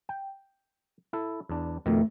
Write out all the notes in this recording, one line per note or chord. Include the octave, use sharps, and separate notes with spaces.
G5
E4 A4
E2 D4
F2 B2 D#3 A3